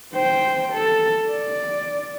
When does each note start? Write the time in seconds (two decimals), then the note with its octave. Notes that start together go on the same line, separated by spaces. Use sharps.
0.15 C5 G5
0.73 A4
1.30 D5